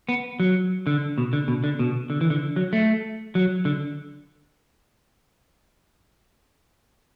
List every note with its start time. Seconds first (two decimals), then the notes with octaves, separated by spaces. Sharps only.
0.09 B3
0.40 F#3
0.87 D3
1.18 B2
1.33 D3
1.48 B2
1.64 D3
1.79 B2
2.10 D3
2.21 E3
2.30 D3
2.56 F#3
2.73 A3
3.35 F#3
3.65 D3